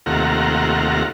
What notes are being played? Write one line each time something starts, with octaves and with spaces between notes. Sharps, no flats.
D#2 C3 A3 F4 F#5 A#5